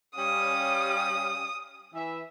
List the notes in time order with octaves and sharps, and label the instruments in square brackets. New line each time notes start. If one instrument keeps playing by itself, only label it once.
[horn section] G3 C#4 F5 [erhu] D#6
[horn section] E3 E5